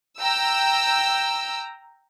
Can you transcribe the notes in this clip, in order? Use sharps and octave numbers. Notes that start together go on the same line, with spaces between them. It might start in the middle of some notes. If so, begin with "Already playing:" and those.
G5 A#5 E6